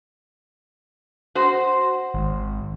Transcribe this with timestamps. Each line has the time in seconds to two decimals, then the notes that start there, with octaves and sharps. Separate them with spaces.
1.35 F#4 C5
2.14 G#1